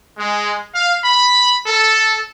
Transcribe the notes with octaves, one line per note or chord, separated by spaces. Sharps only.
G#3
F5
B5
A4